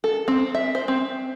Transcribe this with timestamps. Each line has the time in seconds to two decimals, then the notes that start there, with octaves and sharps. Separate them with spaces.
0.04 A4
0.28 C4
0.55 E5
0.75 C5
0.88 C4